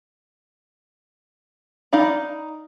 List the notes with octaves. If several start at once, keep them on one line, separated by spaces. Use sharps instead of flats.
D#4 D5 F5 B5